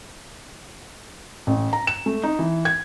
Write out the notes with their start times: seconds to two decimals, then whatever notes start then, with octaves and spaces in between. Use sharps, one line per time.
1.47 A1
1.73 A#5
1.87 E7
2.06 A3
2.23 D#4
2.39 E3
2.65 G#6